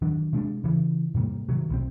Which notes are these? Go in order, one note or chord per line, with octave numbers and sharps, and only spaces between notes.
D#3 F#3 D4
C3 G#3 C#4 D4
C#3 E3
G#2 C3 G3 A#3
C3 D#3 F#3
B1 F#3 C4